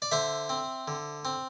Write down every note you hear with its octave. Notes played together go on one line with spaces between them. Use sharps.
D5
D3 C5 E5
C4
D3
C4